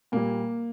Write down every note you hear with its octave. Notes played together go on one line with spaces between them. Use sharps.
A#2 G3 A#3